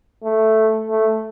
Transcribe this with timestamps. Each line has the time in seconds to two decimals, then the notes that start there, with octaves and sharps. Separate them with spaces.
0.24 A3
0.87 A3